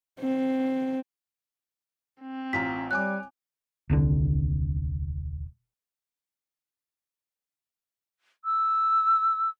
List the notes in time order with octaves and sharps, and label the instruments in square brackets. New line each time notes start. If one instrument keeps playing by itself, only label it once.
[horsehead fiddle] C4
[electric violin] C4
[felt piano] A1 F4 A#5 [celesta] B6
[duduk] G3 [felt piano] C#5 G#5 D6 [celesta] F#6
[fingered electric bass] D#1 C2 D3
[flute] E6